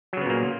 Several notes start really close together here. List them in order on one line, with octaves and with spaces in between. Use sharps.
F#3 C#3 B3 A#2 A#3